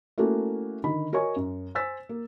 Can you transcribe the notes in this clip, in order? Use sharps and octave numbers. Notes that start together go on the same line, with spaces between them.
A3 A#3 C#4 E4 F#4 A4
D3 D#3 B5
F#4 A#4 C#5 D#5 G#5 C#6
F#2
C5 G#5 E6 A6 B6
A#3